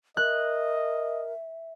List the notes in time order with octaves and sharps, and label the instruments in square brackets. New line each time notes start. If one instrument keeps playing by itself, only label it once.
[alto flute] A#4 [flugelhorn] D#5 [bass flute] E5 [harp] F#6